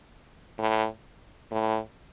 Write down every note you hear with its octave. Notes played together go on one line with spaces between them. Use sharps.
A2
A2